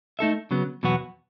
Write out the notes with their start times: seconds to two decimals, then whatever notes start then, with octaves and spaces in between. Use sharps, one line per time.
0.19 A3 D#4 A4 E5
0.51 C#3 F#3 B3
0.83 E2 B2 F#3 B3 F#4